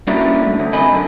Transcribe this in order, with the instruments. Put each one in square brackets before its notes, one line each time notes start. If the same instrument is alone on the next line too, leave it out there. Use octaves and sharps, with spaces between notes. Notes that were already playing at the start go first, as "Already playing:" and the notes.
[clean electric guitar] G3 A#3 C#4 D4 E4 F#4
A3
D2
F#2 C3 D#5 G#5 B5
F#2 D3